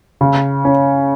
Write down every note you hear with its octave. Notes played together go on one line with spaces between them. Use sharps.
C#3
C#4